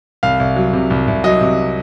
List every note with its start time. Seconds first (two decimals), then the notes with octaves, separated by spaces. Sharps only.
0.23 C2 F5
0.40 C2
0.56 F#3
0.73 C3
0.90 C2
1.08 C2
1.24 F#3 D#5
1.41 C3